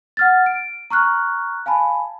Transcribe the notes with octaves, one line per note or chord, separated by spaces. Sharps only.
F#5 F6 A6
D7
A#5 C#6 F6 F#6
F5 G#5 A5 B5